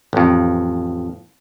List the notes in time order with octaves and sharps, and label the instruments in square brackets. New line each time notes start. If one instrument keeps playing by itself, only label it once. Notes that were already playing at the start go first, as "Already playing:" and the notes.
[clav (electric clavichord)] A1 F2